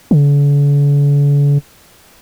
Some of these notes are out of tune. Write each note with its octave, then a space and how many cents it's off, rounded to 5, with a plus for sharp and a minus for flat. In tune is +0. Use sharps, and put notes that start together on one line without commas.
D3 -45